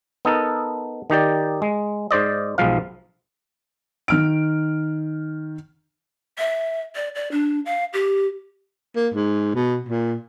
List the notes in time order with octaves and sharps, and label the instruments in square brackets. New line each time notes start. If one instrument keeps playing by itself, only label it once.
[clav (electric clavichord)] B3 D#4 A4 A#4
D#3 D#4 G4 D5
G#3
G#2 C5 D5 D#5
B1 G#2 F3 F5
[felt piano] D#3 F6 D7
[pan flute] E5
D5
D5
D4
F5
G4
[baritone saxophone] A#3
G#2
B2
A#2